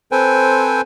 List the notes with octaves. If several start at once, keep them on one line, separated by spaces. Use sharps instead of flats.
C4 A4 B4 C5 G5 G#5